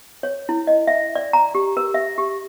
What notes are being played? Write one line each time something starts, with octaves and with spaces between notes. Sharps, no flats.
C#5
E4
D#5
E5
D5
A#5
G4
A#4
E5
G4